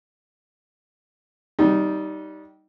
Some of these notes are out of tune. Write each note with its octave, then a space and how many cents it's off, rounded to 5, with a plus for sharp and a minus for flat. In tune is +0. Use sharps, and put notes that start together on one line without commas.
G3 -20 D#4 +0 F#4 -30